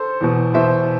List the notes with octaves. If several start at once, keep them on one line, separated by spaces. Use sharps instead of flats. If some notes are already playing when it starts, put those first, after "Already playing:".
Already playing: A4 C5
E2 B2
E2 B2 C5 E5